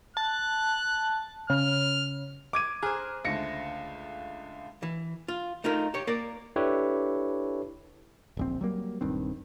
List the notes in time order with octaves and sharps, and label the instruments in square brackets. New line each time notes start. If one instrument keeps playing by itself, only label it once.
[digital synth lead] A5 [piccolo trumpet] F#6
[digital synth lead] C#3 [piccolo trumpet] F6
[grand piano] D6 G#6 D#7
[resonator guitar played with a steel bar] G#4 C5 [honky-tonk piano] A#5 F6 F#6
[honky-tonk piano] C#2 D3 A3 [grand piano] A#6 C#7
[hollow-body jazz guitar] E3
F4
A3 D#4 F4 A#4
G4 C#5
A#3 A#4 D5
[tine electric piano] D4 E4 G4 A4 B4 C#5
[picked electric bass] D1 A#1 C4
F#3 G3 A#3
D#1 G2 D#3 C4